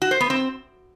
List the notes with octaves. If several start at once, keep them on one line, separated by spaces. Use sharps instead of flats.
F#4
C5
B3
C4